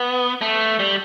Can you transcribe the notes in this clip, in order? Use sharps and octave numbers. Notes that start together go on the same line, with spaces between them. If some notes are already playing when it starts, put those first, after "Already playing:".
Already playing: B3
A3
G3